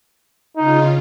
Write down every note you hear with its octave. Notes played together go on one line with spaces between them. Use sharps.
C#3 D#4 F4